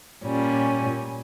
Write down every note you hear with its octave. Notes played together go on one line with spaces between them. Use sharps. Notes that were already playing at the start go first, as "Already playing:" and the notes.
A#2 G3 C#4